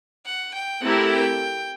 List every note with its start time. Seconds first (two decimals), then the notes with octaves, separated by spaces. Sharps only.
0.25 F#5
0.54 G5
0.81 A3 C4 E4 G4 A#4 F#5
1.10 G5